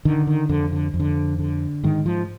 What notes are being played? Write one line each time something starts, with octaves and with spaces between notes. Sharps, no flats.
D3 D#3
D#3
F2 D3
D3
F2
D3
D3
G#2 D#3
F3